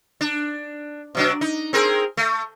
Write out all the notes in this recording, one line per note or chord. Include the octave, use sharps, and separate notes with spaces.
D4
B2 F#3 D4
D#4
C4 G#4 A#4
A3